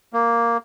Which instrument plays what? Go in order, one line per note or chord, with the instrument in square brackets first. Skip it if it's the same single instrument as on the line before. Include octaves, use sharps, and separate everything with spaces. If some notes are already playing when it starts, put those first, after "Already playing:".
[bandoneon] A#3